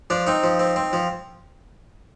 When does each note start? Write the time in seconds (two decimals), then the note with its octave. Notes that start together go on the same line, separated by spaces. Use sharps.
0.10 F3 D4
0.27 C4 D#4
0.43 F3
0.59 C4
0.76 C4
0.93 F3